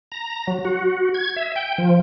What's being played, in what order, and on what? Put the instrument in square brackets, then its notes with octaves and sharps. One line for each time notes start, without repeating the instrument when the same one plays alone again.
[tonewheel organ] A#5
F#3
F#4
G#6
E5
G5
F3